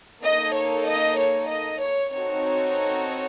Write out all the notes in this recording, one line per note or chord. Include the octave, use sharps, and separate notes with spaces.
A#3 D#4 A4 D#5
C#5
D#5
C#5
D#5
C#5
C4 D#4 F#4 A4 C#5